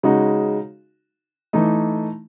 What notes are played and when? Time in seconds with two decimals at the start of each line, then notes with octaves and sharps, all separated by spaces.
0.03 C#3 G#3 D#4 F#4
1.53 E3 A3 D#4